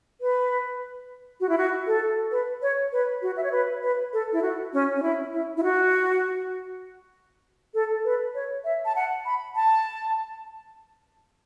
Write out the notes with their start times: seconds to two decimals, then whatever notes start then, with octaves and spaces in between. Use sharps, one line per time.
0.21 B4
1.40 F#4
1.49 E4
1.58 F#4
1.87 A4
2.32 B4
2.62 C#5
2.92 B4
3.22 F#4
3.37 E5
3.44 C#5
3.52 B4
3.82 B4
4.13 A4
4.33 E4
4.42 F#4
4.73 C#4
4.96 C#4
5.02 E4
5.33 E4
5.57 E4
5.63 F#4
7.74 A4
8.05 B4
8.35 C#5
8.64 E5
8.85 A5
8.96 F#5
9.26 B5
9.56 A5